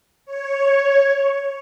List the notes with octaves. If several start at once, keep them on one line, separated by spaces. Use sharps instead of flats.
C#5